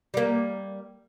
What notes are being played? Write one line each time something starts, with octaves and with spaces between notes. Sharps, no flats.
G3 A#3